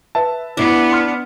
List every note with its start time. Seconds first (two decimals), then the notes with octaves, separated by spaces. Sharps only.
0.15 B4 E5 A5
0.57 B3 D4 E4
0.93 C6 F6 C#7